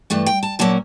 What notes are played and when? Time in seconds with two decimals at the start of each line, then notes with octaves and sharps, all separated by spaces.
0.10 G2 E3 A3 A5
0.26 G5
0.43 A5
0.59 A#2 F#3 A#3 C#4 A5